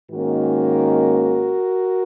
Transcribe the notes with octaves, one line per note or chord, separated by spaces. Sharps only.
G#2 D#3 A#3 C#4 F#4 A#4